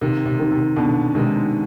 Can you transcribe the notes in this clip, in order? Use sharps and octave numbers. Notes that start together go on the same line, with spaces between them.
C3 D#3
C3
D#3
C3
B2 D3 D4
C3 D#3 G#3